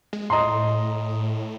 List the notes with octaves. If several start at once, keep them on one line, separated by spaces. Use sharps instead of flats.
G#3
A2 D#5 A#5 C6